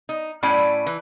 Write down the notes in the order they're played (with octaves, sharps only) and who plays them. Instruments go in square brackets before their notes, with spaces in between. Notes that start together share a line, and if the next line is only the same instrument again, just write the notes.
[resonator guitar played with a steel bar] D#4
A2 C#4 E4 D5 G5
E3